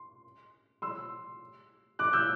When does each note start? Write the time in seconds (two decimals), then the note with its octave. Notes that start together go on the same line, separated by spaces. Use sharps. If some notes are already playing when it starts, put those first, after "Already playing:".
Already playing: C6
0.82 C6 E6
1.99 D6 F#6
2.13 E6 G6